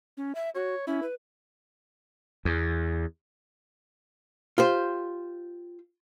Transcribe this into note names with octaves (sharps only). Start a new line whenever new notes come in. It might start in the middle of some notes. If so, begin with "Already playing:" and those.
C#4
E5
F#4 C#5
C#4 E4
B4
E2
F4 G4 C5